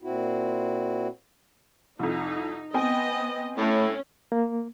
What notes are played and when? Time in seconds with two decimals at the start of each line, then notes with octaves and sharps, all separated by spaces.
0.02 A#2 C4 E4 F#4
1.99 C2 F2 D#4
2.74 B3 C4 D#5 G5 G#5
3.58 A2 A3 C#4
4.32 A#3